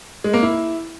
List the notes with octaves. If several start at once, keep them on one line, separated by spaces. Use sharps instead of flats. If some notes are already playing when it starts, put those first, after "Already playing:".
G#3
A#3
E4